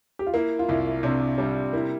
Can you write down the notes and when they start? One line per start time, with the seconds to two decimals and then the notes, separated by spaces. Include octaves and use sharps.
0.19 G4
0.27 F4
0.34 A#3 E4
0.59 F4
0.69 C2 E4
1.03 C3 D4
1.38 G3 D4
1.73 A#3 E4